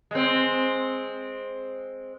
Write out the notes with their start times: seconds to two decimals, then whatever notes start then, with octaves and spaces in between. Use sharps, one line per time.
0.11 G#3 C4